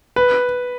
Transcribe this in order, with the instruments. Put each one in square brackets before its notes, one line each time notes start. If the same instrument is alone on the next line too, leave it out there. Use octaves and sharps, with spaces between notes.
[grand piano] B4